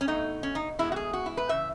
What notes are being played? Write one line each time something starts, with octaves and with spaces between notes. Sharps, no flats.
C#4
B2 A3 D#4
C#4
D#4
E2 B2 G#3 E4
F#4
G#4
F#4
E4
B4
C#3 E3 E5